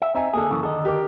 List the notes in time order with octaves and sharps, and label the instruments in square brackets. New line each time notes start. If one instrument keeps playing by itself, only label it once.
[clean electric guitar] E5
[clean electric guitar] C4 D#4 [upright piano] D#5 E5 G#5
[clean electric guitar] D3 G#4 [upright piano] A#3 A4
[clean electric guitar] F#2 C#3 E3
[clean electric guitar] D3 D#3 D#5 [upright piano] A4
[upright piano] G4 A#4 D6